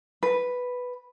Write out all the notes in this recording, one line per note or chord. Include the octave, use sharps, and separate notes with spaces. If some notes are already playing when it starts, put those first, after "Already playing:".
B4